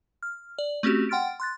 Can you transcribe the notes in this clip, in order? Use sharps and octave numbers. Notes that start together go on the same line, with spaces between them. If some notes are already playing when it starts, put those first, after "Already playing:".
F6
D5
A3 C4 C#4 F#4 G4
F#5 G5 C6 F6 A6 D7
C6 F#6 A6